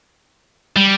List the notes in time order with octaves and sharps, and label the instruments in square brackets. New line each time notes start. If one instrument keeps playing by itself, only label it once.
[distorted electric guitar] G3